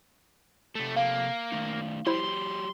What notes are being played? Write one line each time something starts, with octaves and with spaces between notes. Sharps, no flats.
C3 A3 A4
A#3 F5
D#3 A3 D#4
F#3 E4 G4 C5 C6